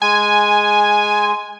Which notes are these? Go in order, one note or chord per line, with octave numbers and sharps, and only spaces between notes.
G#3 G#5